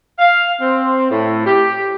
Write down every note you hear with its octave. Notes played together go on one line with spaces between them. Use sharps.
F5
C4
A2
G4